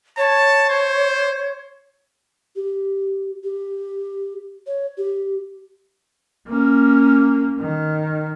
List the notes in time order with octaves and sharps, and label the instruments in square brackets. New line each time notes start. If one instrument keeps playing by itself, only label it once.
[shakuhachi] C#5 [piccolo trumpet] A5
[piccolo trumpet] C5
[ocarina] G4
G4
C#5
G4
[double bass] A#3 C#4
D#3